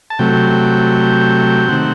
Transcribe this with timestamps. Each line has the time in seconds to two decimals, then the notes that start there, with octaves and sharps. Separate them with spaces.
0.10 A5
0.19 C3 F#3 A3 G5
1.68 C3 D#3 A3 C4 F#5